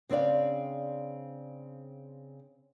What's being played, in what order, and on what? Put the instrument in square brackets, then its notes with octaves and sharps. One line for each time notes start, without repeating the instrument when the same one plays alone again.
[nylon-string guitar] C#3 C4 D4 D5 F5